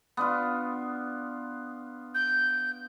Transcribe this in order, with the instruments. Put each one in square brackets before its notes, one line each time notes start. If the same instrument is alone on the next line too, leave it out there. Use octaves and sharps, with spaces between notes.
[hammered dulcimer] B3 D4 F4
[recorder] G6